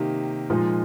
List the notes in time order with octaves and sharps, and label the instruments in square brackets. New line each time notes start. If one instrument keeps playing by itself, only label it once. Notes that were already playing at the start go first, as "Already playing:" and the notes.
Already playing: [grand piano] C3 D#3 A#3 D#4 G4
A#2 F3 G#3 D#4